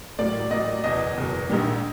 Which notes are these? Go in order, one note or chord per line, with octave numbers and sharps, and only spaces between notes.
A1 A2 F#3 A#3 D5
A1 A2 F#3 A#3 D#5
F#1 E2 B2 D#5
F#1 E2 B2
A#1 G#2 D#3 G3